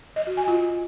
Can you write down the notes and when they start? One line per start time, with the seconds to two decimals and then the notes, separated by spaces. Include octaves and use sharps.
0.16 D#5
0.27 F#4
0.37 G#5
0.48 F4